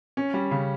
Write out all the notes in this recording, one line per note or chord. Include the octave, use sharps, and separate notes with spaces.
C#4
G3
C#3